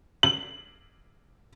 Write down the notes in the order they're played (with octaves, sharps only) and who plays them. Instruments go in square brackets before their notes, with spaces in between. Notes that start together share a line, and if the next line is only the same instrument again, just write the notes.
[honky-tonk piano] F#7